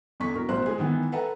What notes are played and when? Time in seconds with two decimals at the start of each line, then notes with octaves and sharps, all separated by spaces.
0.20 E2 D3 C#6 B6
0.35 B2 A#4
0.49 A1 B2 C4 C5 C6 F#6
0.66 G#3 G#4
0.79 D#3 E3 B3
1.12 A4 B4 E5 F#5 A#5